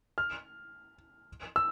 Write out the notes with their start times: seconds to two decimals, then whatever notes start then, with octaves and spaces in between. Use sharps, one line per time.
0.18 F6
1.56 E6